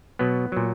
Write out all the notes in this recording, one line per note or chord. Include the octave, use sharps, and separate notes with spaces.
B2 F#3 B3
A#2 F#3